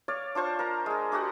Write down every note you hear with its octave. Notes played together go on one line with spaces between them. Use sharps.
C#5 D5 F5
D4 F4 C5 C#6
A#4 A#5
G#3 G#4
D4 F#4 G4 F#5